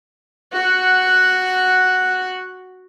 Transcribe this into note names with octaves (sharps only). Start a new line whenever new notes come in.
F#4 F#5